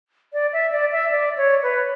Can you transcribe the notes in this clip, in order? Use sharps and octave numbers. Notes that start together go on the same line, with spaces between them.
D5
E5
D5
E5
D5
C#5
B4